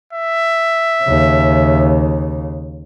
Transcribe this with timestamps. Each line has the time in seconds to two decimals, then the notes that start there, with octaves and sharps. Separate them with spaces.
0.13 E5
1.04 D#2 C#3